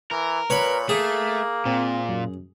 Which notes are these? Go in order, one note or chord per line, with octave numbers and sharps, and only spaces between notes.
E3 A#4
A#2 B4 C#5 B5
A3 A#3 G#4 C7
A#2 C4
F#2